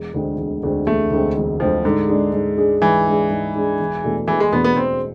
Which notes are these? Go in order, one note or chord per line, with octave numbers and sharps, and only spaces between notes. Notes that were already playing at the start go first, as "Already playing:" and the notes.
Already playing: E1
D2 D3 G#3 C4
E1
D2 D3 G#3 C4
E1 A3
D2 D3 G#3 C4
E1
D2 D3 F3 G#3 C4
G#2 D3
G#3 D4 G#4
G#2
G#3 D4 G#4
G#2 E3
G#3 D4 G#4
G#2
G#3 D4 G#4
E1
E2 B2 A3 D4
E1 E3
G#3
E2 B2 A3 B3 D4
B3
E1 C4